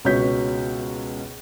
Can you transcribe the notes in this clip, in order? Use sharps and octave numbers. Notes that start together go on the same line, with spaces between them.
C#2 B2 F#4 C#5 G6 B6